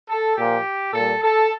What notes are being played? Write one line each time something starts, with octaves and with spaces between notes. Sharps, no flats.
A4
A#2 F3 G4
A#2 G3 A4
A4